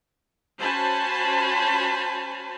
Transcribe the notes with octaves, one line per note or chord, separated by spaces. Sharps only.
C#4 F#4 C5 G#5 A5 B5